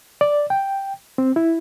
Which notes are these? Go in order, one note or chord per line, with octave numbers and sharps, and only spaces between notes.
D5
G5
C4
E4